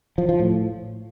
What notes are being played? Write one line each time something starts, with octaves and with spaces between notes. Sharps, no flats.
F3
F3
A2